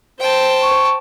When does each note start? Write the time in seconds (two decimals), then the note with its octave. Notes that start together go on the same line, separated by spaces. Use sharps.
0.20 C5 G5 A5
0.63 C#6